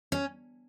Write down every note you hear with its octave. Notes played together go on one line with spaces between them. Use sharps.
C#4